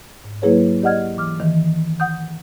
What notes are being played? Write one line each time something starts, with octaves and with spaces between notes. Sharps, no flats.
G#2
F#3 A#3 E4 G#4 B4 C#5
G4 D5 D#5 F#5 F6 G#6
E3 D6 F6
D#3 E3
F#5 D#6 G6